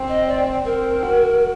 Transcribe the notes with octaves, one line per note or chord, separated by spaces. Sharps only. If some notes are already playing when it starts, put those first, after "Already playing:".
Already playing: C4
D#5
D5
C4 A#4
F#4